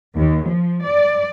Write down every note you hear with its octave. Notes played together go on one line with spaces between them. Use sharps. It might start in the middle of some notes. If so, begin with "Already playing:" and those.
D#2
F3
D5